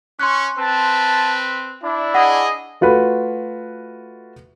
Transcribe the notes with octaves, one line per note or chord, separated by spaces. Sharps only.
C#4 C6 C#6 F#6
C4 B4 A5
D4 E4
G#4 D#5 F#5
A3 F4 F#4 B4